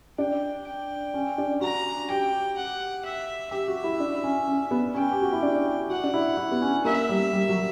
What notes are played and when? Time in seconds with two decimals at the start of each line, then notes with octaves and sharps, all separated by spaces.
0.18 D4 G5
0.67 G5
1.14 C#4
1.38 D4
1.61 F#4 A#5
2.10 G4 G5
2.57 F#5
3.05 E5
3.51 G4 E5
3.68 F#4
3.84 E4
4.00 D4
4.23 C#4
4.48 C#4
4.71 B3
4.94 C#4 G5
5.12 G4
5.22 F#4
5.32 E4
5.43 D4
5.90 F#4 F#5
6.04 D4
6.14 E4
6.37 E4
6.52 B3
6.62 C#4
6.85 A#3 E5
7.09 G3
7.33 G3
7.49 F#3